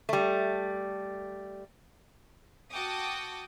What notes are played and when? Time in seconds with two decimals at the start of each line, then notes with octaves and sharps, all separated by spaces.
0.09 G3 A3
2.71 F#4 G5 A5 D6 D#6